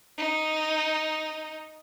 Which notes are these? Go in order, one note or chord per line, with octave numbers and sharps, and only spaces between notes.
D#4